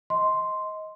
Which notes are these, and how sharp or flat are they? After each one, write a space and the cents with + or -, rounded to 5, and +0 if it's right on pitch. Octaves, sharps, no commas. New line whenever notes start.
D#5 +20 C6 +0